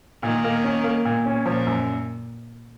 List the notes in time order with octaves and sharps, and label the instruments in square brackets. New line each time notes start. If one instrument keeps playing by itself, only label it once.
[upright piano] A#2 [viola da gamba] D#3
[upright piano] A#3
C#4
A#3
A#2
C#4
[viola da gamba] A#2 [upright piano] F3
[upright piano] F#2